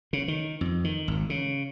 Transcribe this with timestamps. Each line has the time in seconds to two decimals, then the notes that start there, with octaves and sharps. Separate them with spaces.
0.13 C#3
0.28 D#3
0.61 F2
0.84 D#3
1.08 G#1
1.30 C#3